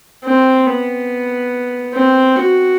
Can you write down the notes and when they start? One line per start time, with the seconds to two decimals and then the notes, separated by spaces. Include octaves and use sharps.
0.24 C4
0.66 B3
1.94 C4
2.37 F#4